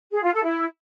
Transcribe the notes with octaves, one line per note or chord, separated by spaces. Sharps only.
G#4
F4
A4
E4